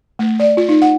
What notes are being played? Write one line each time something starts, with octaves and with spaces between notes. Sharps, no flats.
A3
D5
F4
D#4
F#5